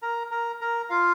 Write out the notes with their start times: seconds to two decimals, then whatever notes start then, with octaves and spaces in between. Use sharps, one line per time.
0.02 A#4 A#5
0.31 A#4 A#5
0.61 A#4 A#5
0.90 F4 F5